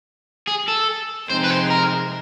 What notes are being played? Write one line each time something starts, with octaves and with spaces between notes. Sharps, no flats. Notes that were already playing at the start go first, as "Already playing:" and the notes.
G#4
A4
C3 F3 G#3 C4 D#4 C5
B4
C5
A#4